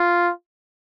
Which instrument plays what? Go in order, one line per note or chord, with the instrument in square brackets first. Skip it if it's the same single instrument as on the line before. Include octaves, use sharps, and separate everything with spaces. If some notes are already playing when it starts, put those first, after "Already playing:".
Already playing: [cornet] F4